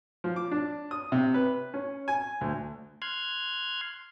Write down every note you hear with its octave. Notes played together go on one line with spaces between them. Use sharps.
F3
D6
D4
D#6
C3
B4
C#4
G#5
D2
C6 F6 F#6 G#6